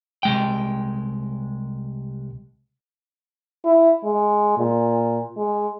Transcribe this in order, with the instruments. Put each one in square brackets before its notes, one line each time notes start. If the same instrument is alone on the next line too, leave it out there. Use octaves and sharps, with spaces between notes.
[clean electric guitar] C2 G#3 G5
[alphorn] E4
G#3
A#2
G#3